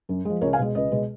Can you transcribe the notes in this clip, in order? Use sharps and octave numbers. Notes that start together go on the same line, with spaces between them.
F#2
F3 G#3
C#2 A#4 C#5
F5 G#5
B2 G#3
C#2 B4 D#5
B2 G#3